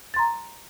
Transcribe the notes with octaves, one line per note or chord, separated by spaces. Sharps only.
A#5 C6 A6